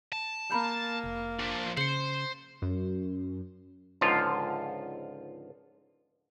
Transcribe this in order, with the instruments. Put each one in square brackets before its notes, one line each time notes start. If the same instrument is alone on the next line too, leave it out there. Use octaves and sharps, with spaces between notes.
[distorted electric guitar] A5
[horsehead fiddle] A#3 [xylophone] A#5 B5 G6
[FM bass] F1
[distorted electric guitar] F3 D4
[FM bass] C#3 [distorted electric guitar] C5 [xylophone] C#7 F#7
[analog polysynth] F#2
[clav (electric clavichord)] C#2 G#2 D3 F3 F4 F5